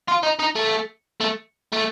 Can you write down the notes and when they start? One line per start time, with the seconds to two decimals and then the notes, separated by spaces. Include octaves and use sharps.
0.08 F4
0.23 D#4
0.39 D#4
0.56 A3
1.20 A3
1.73 A3